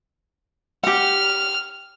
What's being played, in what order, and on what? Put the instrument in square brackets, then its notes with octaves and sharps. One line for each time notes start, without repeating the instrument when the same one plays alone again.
[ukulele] G4 F#5 [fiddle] F6